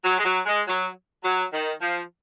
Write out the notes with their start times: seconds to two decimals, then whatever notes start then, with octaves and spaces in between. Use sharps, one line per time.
0.04 F#3
0.17 G#3
0.24 F#3
0.46 G#3
0.67 F#3
1.24 F#3
1.51 D#3
1.80 F3